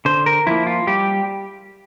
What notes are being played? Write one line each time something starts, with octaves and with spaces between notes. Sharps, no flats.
D3 C5
A#4
F3 A#3 E4
F4
G3 G4